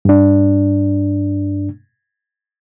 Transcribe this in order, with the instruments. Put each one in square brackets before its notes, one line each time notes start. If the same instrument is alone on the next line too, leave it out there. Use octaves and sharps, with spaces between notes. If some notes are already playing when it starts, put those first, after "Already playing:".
[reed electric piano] G2 D4